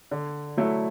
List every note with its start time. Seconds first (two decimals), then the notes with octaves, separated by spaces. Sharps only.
0.11 D3
0.57 F#3 A3 E4